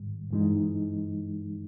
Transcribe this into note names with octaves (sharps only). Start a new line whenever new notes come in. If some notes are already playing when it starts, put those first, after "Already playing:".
Already playing: G#2 D#3 G3
G2 E3 G#3 D#4